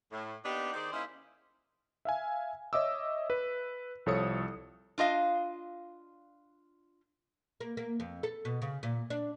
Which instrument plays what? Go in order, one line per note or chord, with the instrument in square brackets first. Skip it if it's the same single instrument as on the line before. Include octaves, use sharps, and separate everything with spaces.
[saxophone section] A2
A#3 B3 D4 D#4 G4
D#3 D#4 G#4 C5 D5
A#3 C#4 D#4 E4 C5 E5
[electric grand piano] E5 F5 G#5
C#5 D#5 E5 D6 E6
B4
C2 F3 A4 C#5 D#6 C#7
[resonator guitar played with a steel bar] D4 F4 D#5 F5
[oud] A#3
A#3
F2
A4
B2
C#3
A#2
D4